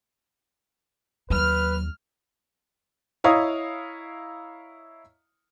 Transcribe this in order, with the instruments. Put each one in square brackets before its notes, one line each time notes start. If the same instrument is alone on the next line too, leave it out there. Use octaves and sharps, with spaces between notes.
[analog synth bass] D#2 [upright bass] F#3 [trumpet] B4 [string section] F6
[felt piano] E4 C#5 D#5 F5 A#5 D#6